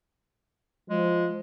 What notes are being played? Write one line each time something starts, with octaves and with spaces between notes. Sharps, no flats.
F3 G#3